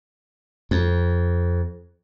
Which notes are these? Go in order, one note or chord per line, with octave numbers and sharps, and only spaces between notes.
F2